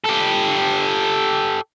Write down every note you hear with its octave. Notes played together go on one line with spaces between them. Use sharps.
G4 A4